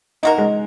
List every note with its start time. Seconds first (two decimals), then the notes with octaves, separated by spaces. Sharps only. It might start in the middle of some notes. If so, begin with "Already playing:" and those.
0.23 A#3 D#4 F#4 A#4
0.38 G#3